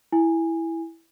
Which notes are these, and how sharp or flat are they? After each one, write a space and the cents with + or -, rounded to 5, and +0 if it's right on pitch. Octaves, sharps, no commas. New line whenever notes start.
E4 +0 G#5 -10